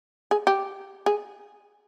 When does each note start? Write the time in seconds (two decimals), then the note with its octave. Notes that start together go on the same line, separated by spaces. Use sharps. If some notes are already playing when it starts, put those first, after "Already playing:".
0.31 G#4
0.47 G4
1.06 G#4